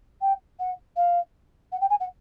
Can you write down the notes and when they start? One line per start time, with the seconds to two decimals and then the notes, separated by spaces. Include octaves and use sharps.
0.21 G5
0.59 F#5
0.96 F5
1.72 F#5
1.81 G5
1.90 G#5
2.00 F#5